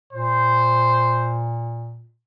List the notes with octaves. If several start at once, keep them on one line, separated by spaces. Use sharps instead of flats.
A#2 C5